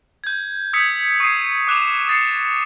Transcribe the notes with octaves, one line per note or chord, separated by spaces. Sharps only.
G6 G#6
D#6 E6 G6 G#6 B6 C#7
C#6 D#6 G#6 C7 D#7
D6 F#6 E7 F7
D#6 A6 C7 C#7